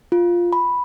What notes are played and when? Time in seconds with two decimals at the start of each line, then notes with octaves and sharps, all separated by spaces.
0.12 F4
0.53 B5